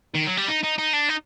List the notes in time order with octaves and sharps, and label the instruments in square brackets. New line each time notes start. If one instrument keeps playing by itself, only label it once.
[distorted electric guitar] D#3
F#3
G3
D#4
D#4
D#4
D4
D#4